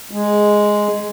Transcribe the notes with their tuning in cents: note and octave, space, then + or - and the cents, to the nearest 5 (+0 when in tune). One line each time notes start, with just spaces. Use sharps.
G#3 +0